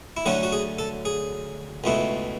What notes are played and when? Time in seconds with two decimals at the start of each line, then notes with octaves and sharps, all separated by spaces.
0.17 E4
0.26 D2 D3 F#3 A3 C#4 F#4
0.43 F#4
0.53 G#4
0.79 A4
1.05 G#4
1.84 C#2 B2 A3 E4